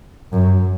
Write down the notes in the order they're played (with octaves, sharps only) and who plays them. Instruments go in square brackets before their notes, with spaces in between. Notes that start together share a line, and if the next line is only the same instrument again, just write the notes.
[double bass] F#2